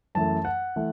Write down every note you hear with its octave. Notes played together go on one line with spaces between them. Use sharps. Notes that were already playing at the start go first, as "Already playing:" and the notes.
F#2 E3 A3 A5
F#5
E3 A3